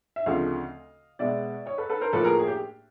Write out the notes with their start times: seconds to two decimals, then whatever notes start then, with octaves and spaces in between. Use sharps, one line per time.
0.16 E5
0.26 D2 C#3 F3 A3 C4 D#5 F5
1.19 B2 G#3 B3 D5 E5
1.66 C#5 D#5
1.78 A4 B4
1.90 A4 B4
2.01 A#4 C5
2.13 A2 F3 A#3 A4 B4
2.24 G#4 A#4
2.39 G#4
2.48 G4